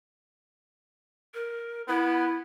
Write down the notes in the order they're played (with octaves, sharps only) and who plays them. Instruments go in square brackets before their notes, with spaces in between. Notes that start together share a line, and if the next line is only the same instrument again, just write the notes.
[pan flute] A#4
[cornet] B3 [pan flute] E4